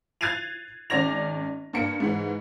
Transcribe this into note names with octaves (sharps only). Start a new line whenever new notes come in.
F#6 G#6 A6 C7 D#7 F7
G#1 C#4 D5 D6 A#6 F7
G2 A#3 C#7
G#2 E3